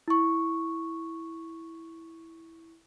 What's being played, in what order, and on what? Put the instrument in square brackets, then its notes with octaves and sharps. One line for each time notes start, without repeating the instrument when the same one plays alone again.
[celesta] E4 C#6